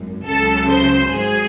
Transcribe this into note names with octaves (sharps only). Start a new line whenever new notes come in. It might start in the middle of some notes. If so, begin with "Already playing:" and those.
Already playing: G#1 F#2
C#2 C#3 F#3 A4
C5
G#1 G#2 F#3 G#4